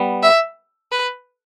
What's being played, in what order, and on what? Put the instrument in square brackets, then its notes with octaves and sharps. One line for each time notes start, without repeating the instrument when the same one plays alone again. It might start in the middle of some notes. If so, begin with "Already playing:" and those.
Already playing: [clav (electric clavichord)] G3 B3
[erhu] E5
B4